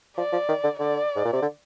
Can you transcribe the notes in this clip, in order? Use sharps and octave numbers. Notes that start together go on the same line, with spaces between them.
F3 D5
F3
D#3
D3
D3 D5
G#2
A#2
C3
D3